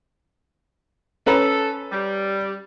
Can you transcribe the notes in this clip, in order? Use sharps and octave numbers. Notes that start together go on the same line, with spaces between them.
C#4 A4 B4 A#5
G3